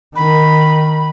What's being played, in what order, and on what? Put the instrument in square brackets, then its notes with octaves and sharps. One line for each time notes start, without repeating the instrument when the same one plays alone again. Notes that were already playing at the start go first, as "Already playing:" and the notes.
[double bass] D#3 [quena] B5